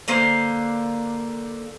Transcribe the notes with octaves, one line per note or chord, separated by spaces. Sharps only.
D3 A#3 C5 F5